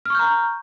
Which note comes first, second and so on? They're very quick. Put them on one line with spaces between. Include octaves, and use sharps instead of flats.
F6 C#6 G6 A#5